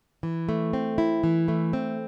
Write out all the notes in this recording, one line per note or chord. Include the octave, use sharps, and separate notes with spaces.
E3
A3
C4
E4
E3
A3
C4